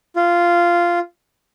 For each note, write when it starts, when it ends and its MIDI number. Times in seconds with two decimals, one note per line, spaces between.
0.16 0.99 65